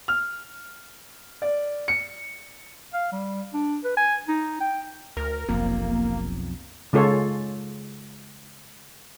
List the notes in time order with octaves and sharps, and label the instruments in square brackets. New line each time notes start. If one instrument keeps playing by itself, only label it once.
[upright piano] F6
D5
C#7
[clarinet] F5
G3
D4
B4
G#5
D#4
G5
[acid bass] D2 [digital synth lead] A#4
[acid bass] F1 [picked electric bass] B1 F2 [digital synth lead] A#3
[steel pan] C#3 G#3 F4 A4 C#5